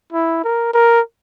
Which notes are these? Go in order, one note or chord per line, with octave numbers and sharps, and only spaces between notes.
E4
A#4
A#4